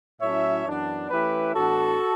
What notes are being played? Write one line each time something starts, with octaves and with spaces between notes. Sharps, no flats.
A2 F#3 A3 C#4 E4 C#5 E5
F#2 E3 B3 D4
E3 A3 C#4 E4 G4 B4
A2 E3 B3 D4 F#4 A4